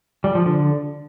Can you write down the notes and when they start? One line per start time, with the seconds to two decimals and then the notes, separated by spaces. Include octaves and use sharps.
0.24 G3
0.35 F3
0.46 D3